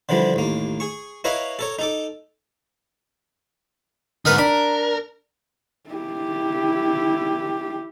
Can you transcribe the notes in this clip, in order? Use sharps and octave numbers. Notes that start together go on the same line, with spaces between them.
D3 E3 F3 G3
A1 D#2 A#3
G#4 C#6
E4 A#4 B4 C#5 D#5 F5
A4 A#4 C#5
D#4 A4 D6
G#2 D3 D#4 A#4 B4
D4 A#4 B5
E4 G4